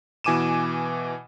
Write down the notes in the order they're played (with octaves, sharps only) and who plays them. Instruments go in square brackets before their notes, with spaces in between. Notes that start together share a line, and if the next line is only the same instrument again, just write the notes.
[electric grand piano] B2 E3 G#5 D6 D#7 E7